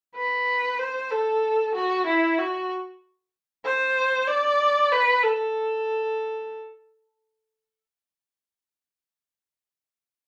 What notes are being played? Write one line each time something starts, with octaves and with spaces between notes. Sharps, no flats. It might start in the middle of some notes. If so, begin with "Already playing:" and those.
B4
C5
A4
F#4
E4
F#4
C5
D5
B4
A4